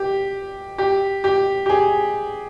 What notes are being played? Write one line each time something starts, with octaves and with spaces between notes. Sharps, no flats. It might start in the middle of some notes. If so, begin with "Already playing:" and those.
Already playing: G4
G4
G4
G4
G#4